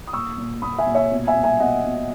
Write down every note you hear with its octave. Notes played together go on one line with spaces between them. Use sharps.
D#6
A#2 C#6 E6
A#2
A#2 B5 D#6
E5 G#5
A#2
C#5 E5
B2
E5 G#5
B2
E5 G#5
B2 D#5 F#5
B2